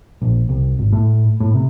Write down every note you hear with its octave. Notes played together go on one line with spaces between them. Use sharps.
A#1
C2
G#1
A2
A2
C3